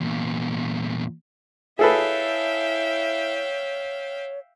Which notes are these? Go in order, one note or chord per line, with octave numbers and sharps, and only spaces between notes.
E2 A#2
E4 G#4 A4 B4 C#5 E5 F5 G5